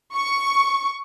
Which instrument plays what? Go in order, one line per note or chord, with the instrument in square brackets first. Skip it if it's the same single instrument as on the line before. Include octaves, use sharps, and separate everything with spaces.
[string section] C#6